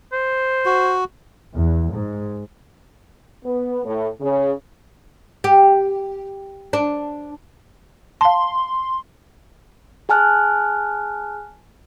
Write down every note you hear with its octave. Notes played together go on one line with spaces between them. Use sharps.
C5
F#4
E2
G#2
B3
A2
C#3
G4
D4
F5 A5 C6
G#4 G#5 A5 F6 F#6